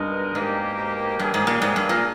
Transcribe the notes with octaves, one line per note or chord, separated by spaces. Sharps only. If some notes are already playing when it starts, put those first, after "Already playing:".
Already playing: G2 B2 G#3 B3 D#4 A#4
G#2 B2 A#3 D#4 G4 A#4
G2 G3 A#3 C#4 G#4
G#2
A#2
G#2
G2
A#2